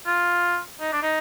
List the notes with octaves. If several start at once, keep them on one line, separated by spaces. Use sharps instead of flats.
F4
D#4
D4
D#4